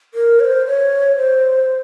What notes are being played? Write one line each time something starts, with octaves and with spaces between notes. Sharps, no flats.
A#4
C#5
C5
C#5
C5